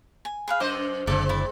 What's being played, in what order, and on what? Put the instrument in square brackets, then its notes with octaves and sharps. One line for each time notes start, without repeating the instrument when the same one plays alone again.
[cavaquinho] G#5
G#4 B4 F5
[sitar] F#2 C5 D#5 [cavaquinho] D6
[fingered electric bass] F#1 D3 [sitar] G#3 C4 [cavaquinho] D5 E5 A5
[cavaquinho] E4 D5